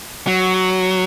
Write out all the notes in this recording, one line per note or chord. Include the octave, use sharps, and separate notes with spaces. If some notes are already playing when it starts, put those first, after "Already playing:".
F#3